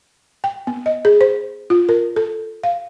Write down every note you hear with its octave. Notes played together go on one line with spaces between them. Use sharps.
G5
B3
D#5
G#4
C5
F4
A#4
A4
F5